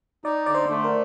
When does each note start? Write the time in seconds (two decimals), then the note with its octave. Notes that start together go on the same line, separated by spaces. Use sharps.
0.24 D#4 D5
0.46 D3 D5
0.55 C5
0.70 A3
0.84 A#4